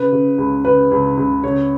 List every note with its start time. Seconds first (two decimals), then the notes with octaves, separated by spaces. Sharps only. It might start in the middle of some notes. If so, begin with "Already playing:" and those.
Already playing: C#3 B4
0.12 C#3
0.38 C#2
0.64 C#3 B4
0.91 C#2
1.17 C#2
1.43 C#3 C#5